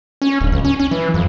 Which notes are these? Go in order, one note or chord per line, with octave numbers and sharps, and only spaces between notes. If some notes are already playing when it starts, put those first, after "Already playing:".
C#4
D1
C#2
C#4
C#4
E3
F2